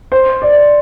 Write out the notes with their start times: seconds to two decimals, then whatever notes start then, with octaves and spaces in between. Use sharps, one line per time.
0.12 C5
0.42 D5